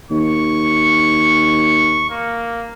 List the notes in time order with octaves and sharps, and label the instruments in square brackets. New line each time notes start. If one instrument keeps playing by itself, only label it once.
[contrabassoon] D#2 [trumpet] C#6
[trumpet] A#3